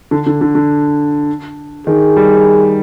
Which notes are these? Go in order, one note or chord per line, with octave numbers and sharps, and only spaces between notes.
D3
D3
D3
D3
D#3 G#4
G3